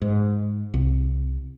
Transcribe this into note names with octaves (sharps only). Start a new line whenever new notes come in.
G#2
C2